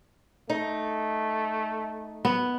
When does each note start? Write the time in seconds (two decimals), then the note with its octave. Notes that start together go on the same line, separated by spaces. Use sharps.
0.50 A3 D#4
2.25 B3